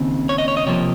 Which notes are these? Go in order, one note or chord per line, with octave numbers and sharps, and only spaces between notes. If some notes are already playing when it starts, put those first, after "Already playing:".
Already playing: D#2 C#3 C4
C#5
D#5
C#5
D#5
C3 F3 A#3 C#5